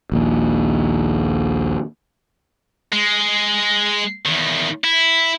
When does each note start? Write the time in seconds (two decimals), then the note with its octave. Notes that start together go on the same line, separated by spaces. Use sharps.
0.12 A#1 D#2
2.92 G#3
4.26 E2 D#3
4.84 E4